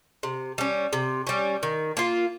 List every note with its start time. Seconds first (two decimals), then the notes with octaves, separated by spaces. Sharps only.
0.23 C3
0.58 G3 C#4
0.93 C3
1.27 G3 C#4
1.63 D#3
1.97 A#3 F4